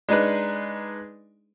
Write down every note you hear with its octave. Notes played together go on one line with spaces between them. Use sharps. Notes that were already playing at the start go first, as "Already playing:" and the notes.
G#3 D4 D#4 G#4 B4